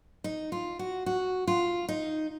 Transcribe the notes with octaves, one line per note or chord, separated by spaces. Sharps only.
D#4
F4
F#4
F#4
F4
D#4